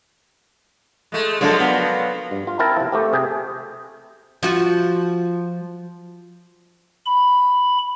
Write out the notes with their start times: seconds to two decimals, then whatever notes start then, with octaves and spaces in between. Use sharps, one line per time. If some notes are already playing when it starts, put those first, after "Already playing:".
1.12 G#3 A3
1.41 F3 F#3 G#3 A#3 D4 A4
1.60 B3
2.31 G2
2.47 F4
2.59 C4 E4 A#4 A5
2.77 C3 F3
2.92 A3 C4 G4
3.13 C3 G#4 G5
4.43 F3 F4 F#4
7.06 B5